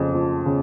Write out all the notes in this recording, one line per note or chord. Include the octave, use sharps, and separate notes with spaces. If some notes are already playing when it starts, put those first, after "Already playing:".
Already playing: F2 C#3 F3
F3
C#3